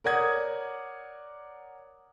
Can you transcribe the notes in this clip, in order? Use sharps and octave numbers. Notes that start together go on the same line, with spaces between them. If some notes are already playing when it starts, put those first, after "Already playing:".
A#4 C#5 D5 F#5 D#6 G#6